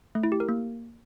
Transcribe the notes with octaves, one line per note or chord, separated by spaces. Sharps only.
A3
E4
G4
A#4
A#3